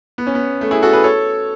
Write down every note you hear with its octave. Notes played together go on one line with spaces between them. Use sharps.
B3
C#4
B3
A3
E4 G#4
F#4 A4
G#4 B4
A4 C#5